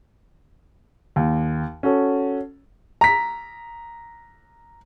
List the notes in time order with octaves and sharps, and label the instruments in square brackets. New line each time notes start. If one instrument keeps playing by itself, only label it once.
[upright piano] D#2
C#4 F#4 A4
[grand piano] A#5 B6